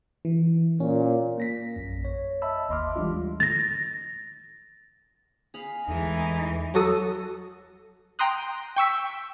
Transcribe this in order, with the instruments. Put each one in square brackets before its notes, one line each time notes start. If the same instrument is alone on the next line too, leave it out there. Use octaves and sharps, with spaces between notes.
[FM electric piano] E3
[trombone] A#2 [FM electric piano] C#4
[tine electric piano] A#3 A#6 B6
A#1 F#2
C#5
D#5 E5 A5 B5 E6
G1 D#2 D#5 C6 D6 F6
E3 G3 G#3 D4 F4
[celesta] A6 A#6
[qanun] G#4 F5 B5
[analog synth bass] E2 [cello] E3 D#4 [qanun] G#3 A3
[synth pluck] F#3 F#4 A4 D#6
G5 A#5 C6 D#6 F#6
G5 C#6 E6 B6